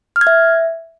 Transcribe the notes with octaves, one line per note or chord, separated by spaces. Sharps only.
F6
G#6
E5